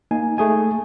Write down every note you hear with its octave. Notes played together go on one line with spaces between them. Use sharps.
A#3 D#4 G#5
A3 G#4 G#5